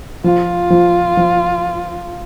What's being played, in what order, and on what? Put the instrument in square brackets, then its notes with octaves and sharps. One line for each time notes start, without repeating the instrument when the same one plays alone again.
[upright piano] F3 [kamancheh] F4
[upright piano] F3
F3